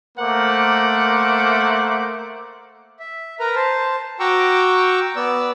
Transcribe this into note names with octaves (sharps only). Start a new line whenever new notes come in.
A3 A#3 A#4 C5 F#5 D6
E5
A#4 B4 A#5
C5 A5
F#4 G5 A#5 C#6 D6 E6
B3 D5 E6